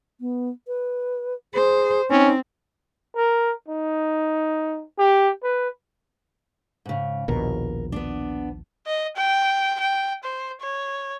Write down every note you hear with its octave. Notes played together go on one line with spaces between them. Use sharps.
B3
B4
G#4 C5
C4 C#4 D#4
A#4
D#4
G4
B4
G#2 C#3
A#1 D#2 B2 A#4
B3 D4
D#5
G5
G5
C5
C#5